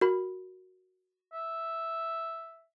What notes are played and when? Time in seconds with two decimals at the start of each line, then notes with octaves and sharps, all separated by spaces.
0.01 F#4 A#4 B5
1.33 E5